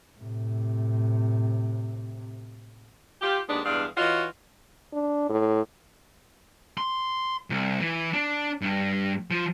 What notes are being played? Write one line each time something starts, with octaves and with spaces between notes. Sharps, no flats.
A2 C3
F4 G4
D#2 G#3 B3 D4
E2 G2 G#3 D4 F5
E3 F4 F#4 C#5 D#5
D4
A2
C6
C2
E3
D4
G2
F3